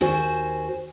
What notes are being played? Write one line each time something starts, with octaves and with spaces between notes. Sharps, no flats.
D#2 F#4 C5 G#5